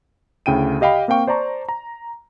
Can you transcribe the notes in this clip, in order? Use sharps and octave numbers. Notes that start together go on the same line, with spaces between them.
D2 C#3 E4 G5 D7 D#7
G4 D#5 F5 G5 B5
A#3 C4 F5 G5 C#6
C5 D5 A5 A#5 C#6
A#5